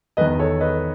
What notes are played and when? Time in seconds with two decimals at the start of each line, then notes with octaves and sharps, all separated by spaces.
0.17 E2 D#3 B4 D#5
0.39 A4 C#5
0.60 B4 D#5